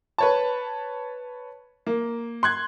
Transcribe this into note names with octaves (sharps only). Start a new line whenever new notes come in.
B4 C#5 A5
A#3
C6 F#6 G#6